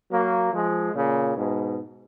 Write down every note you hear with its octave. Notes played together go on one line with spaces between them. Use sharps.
F#3 A#3
F3 G#3
A#2 C#3
G#2 B2